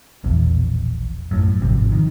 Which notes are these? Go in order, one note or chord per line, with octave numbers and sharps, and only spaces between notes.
E1 A#1 E2
F#2 A2
G#1 C3 F3
D#3